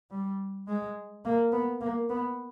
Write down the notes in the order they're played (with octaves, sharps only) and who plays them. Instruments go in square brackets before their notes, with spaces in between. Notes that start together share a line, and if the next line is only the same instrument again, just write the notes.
[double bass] G3
G#3
A#3
B3
A#3
B3